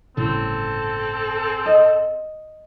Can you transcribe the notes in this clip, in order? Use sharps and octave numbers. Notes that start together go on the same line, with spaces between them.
G1 A2 C#3 C4 A4
D#5